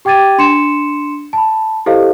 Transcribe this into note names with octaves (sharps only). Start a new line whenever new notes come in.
G4 G5 D6 G#6 A6 D#7
D4 C6 C#7 E7
A5 B5
E4 G4 A4 C5 D#5 F5